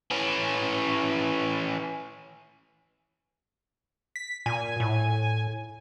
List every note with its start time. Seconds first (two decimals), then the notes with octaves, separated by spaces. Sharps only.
0.11 E3 C#4
4.16 B6
4.46 A#2 G#5
4.80 A2